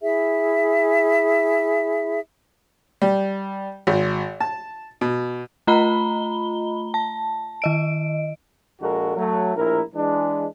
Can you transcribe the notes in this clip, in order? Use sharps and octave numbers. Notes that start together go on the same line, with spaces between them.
E4 G#4 E5
G3
G#1
A5
B2
A3 F4 D#5 A#5 B5 G7
A5
D#3 D#5 D7
A#1 A#2 G#3 F#4 A4 A#4
F#3 A3
A#1 A2 E4 A#4
E3 G#3 D4